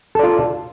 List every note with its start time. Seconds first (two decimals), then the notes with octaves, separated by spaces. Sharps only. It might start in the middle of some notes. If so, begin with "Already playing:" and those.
0.15 A4
0.19 D5
0.23 F4